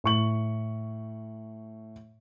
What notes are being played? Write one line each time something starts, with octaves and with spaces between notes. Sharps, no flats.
A2 C#6 F#7